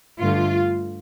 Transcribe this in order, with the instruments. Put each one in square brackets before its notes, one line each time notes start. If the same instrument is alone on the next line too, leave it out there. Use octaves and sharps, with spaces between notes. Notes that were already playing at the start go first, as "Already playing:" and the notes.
[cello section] G2 D3 A3 F4